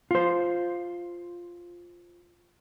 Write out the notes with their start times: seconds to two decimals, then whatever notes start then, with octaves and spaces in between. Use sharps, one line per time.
0.11 F4 C5